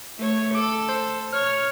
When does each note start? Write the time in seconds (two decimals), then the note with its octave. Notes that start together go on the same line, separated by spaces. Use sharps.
0.17 A3 C#5
0.55 A4 D6
0.89 C5
1.33 C#5 F6